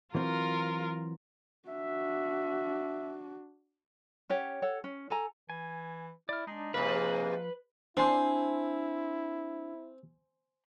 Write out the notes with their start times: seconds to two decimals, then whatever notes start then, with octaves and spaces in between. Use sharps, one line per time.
0.15 E3 F#3 C4 F4 A#4
1.69 D4 F#4 E5
4.30 C#4 G4 C#5 F#5
4.62 A4 C#5 F#5
4.84 C#4
5.10 A4 G#5 A#5
5.50 E3 G#5
6.29 E4 D5 F6
6.47 G#3 D4 D#4
6.74 G#2 C3 F3 A#3 B4 F5
7.97 C4 D4 E4 C5 G#5 C6